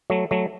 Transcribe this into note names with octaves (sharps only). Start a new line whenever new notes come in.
F#3 A3
F#3 A3